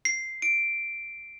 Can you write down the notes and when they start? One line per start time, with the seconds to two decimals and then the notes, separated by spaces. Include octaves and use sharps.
0.05 C7
0.42 D7